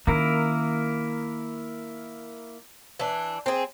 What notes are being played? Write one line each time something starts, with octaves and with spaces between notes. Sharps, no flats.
D#3 A#3 C#4 E4 A#4
E3 D4
C4 G#4